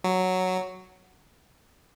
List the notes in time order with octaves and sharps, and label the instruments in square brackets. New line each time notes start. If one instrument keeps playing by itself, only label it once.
[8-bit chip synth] F#3